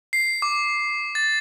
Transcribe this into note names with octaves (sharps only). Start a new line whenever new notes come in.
C7
D6
A6